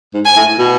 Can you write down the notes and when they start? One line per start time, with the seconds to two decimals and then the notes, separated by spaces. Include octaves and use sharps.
0.14 G#2
0.25 G#5
0.36 A2
0.59 B2